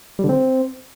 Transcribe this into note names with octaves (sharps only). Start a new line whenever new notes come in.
G3
D3
C4